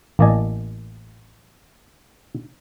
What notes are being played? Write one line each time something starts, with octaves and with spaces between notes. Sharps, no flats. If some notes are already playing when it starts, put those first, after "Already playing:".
A1 A#3 D5 D#5 G#5 A5